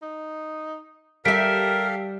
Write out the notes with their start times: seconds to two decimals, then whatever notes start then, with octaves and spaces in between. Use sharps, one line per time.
0.02 D#4
1.25 G3 G4 A4 A#4 E5 F5 B6 D7